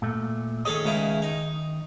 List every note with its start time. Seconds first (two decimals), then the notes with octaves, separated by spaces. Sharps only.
0.02 A#2 A3
0.65 D#3 C#4 G#4 A4 D#5
0.85 C#2 C#3 E4
1.22 D#4